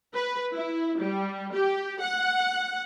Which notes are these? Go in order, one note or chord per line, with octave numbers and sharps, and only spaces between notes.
B4
E4
G3
G4
F#5